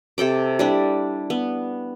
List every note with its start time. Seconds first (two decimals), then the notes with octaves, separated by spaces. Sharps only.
0.18 C3 A4 G5 D6
0.59 G3 D4 E4
1.30 B3